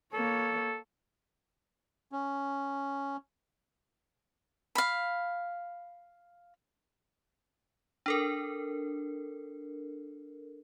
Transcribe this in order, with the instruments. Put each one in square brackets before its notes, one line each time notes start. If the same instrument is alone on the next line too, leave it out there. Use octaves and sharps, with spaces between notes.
[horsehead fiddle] A#3 C#5 [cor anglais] A4
[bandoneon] C#4
[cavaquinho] F5 B5
[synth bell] D4 A4 A#4